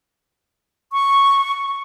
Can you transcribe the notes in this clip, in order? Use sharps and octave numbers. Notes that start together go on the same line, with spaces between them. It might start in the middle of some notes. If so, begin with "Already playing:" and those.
C#6